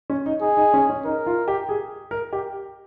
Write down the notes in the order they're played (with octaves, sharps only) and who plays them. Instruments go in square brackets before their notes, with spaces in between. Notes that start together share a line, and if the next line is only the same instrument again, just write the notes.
[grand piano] C#4
D#4
[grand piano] D#4 [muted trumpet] G#4
[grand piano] D#4
C#4
C#4
[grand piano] D#4 [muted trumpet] A#4
[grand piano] F4
G4
G#4
A#4
G4